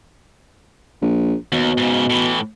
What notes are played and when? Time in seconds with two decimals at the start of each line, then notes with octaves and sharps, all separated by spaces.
1.02 A#1
1.52 D#2 B2
1.78 G#2 C#3
2.10 A2 E3